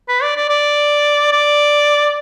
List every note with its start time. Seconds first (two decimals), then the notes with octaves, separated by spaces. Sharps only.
0.09 B4
0.23 D5
0.36 D5
0.49 D5
1.32 D5